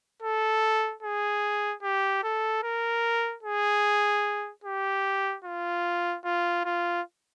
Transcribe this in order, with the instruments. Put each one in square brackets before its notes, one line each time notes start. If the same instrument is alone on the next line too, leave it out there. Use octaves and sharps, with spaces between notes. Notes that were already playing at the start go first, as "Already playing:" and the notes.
[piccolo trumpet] A4
G#4
G4
A4
A#4
G#4
G4
F4
F4
F4